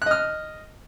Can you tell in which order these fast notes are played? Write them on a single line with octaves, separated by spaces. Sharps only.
F#6 D#5 F6